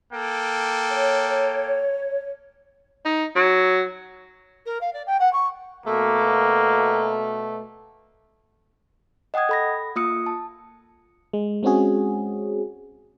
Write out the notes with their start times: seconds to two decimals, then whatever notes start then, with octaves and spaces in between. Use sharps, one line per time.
0.13 A#3 A4 G5
0.90 C#5
3.05 D#4
3.36 F#3
4.65 A#4
4.81 F5
4.93 D5
5.06 G5
5.19 F#5
5.33 C#6
5.86 B2 A3 A#3
9.34 D#5 F#5 G5 D#6 G#6
9.49 A4 B5 A#6
9.96 A#3 F4 D#6 E6 C#7
10.26 A5
11.33 G#3
11.63 G#3 C4 C#4 F#4 G#4